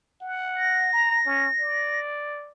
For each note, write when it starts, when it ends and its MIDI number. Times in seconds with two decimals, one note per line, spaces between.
0.21 0.88 78
0.57 2.00 94
0.93 1.21 82
1.26 1.48 61
1.59 2.52 74